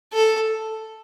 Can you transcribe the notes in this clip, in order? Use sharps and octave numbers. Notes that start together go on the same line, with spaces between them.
A4